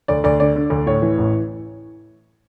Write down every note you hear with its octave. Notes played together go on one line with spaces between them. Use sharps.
D2 D5
D2 D5
D3 D5
D3
D2
A2 C#5
E3
A1